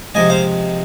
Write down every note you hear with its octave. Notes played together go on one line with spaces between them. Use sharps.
C3 F3 G#3 D#5 G#5
C5 F5